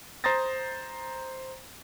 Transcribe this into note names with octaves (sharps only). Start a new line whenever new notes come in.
C5 A#5 C6 D#6 A6 A#6